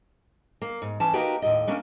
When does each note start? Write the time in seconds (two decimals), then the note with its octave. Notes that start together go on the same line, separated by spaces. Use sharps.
0.62 A#3
0.82 G#2
1.00 E3 C#4 A5
1.13 A#3 D#4 F#4 G4 A#4 B4
1.42 D#2 A2 D#5
1.67 A3 A#3 C#4 D4